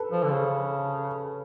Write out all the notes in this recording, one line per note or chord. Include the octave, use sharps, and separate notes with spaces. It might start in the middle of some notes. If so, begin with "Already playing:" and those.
Already playing: A4 B4
F3
D3
C#3